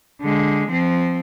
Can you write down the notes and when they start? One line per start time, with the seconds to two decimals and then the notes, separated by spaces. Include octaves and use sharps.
0.21 D3 G#3
0.68 F3 C4